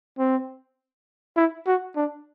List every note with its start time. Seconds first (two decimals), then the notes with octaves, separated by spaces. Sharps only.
0.19 C4
1.37 E4
1.67 F#4
1.96 D4